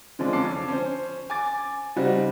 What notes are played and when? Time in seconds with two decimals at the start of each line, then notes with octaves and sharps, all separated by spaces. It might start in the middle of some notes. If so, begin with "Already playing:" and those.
0.19 D3 F3 G#3 C#4 D4
0.33 F2 C#4 A5 D6 C7
0.54 D3
0.68 C#4 C5
1.30 G#5 D6 A6
1.96 C#3 G3 C4 D#4 F#4